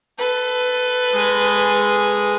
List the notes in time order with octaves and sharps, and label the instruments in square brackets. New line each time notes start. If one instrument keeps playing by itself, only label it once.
[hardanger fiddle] A4 B4
[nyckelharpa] G#3 G#4